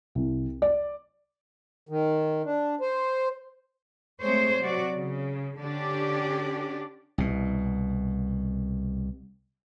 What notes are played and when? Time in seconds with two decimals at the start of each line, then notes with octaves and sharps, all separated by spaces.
0.15 C2
0.62 D5
1.89 D#3
2.45 D4
2.81 C5
4.22 G#3 A3 C4 C5 C#5
4.59 C3 F#3 F#4 D5
4.94 C#3
5.60 D3 C#4 D4 G4 D5
7.18 C2 B2